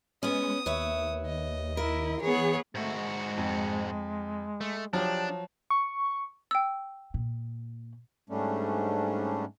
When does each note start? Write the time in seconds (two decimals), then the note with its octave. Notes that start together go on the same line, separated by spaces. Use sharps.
0.23 G#3 B3 C#4 D#6
0.66 D#2 B4 C#5 E5
1.26 D#5
1.77 E4 A#4
2.21 E3 B3 G#4 C#5
2.75 G#2 A3 F#4
2.96 G#3
3.37 F2
4.61 A3
4.93 F3 F#3 D4 G4
5.70 C#6
6.51 G5 E6
7.14 A#2
8.30 G#2 G3 A3 C#4 D4